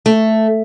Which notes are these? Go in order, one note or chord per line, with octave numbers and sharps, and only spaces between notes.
A3